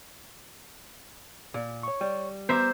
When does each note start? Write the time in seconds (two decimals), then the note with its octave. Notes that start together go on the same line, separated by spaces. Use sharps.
1.54 A#2
1.83 C#5 C#6
2.01 G3
2.49 B3 C5 E5 A#5 D6